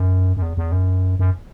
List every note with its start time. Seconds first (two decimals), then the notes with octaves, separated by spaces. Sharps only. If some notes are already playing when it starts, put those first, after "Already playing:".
Already playing: F#2
0.37 F#2
0.42 E2
0.57 E2
0.72 F#2
1.19 F#2